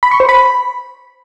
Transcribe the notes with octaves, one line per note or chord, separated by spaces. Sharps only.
B5
C#6
C5
B5